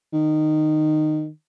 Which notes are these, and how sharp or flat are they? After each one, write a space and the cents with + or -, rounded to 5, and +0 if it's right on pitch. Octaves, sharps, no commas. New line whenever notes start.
D#3 -15